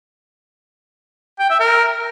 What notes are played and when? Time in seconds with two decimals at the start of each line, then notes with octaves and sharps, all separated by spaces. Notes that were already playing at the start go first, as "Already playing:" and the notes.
1.40 G5
1.50 E5
1.60 A#4